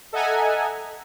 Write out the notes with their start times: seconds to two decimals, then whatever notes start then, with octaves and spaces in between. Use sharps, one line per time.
0.13 A4 D#5 E5 F#5 G#5 A#5